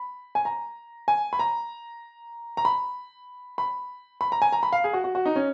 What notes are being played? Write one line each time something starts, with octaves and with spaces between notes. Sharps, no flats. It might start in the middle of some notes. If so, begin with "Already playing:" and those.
Already playing: B5
G#5
A#5
G#5
B5
A#5
A#5
B5
B5
B5
A#5
G#5
A#5
B5
F5
G#4
F#4
F#4
F#4
D#4
C#4